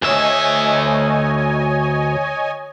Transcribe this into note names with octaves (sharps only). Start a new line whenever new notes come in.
D2 C#5 D#5 E5 G#5